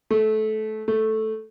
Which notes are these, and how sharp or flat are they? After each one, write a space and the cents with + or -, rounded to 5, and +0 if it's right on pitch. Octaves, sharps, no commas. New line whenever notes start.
A3 -20
A3 -5